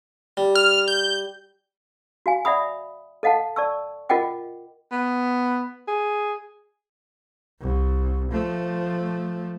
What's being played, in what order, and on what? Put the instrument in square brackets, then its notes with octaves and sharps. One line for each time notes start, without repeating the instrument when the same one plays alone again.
[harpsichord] G3
[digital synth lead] F6
G6
[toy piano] F#4 F5 G#5
D5 E5 F#5 B5 D#6
A4 D#5 F5 F#5 A5
D5 A5 C#6 E6
F4 A#4 D#5 F#5 G5 D6
[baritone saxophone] B3
G#4
[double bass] C2
F3 A3